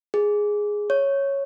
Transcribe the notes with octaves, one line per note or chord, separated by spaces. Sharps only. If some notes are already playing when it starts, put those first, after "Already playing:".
G#4
C#5